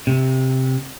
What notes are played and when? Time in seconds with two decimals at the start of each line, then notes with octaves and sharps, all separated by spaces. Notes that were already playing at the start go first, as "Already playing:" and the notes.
0.07 C3